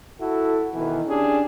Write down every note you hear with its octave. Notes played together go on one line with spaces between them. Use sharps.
E4 F#4 A4
B2 D#3 E3
C#4 D4 G4 G#4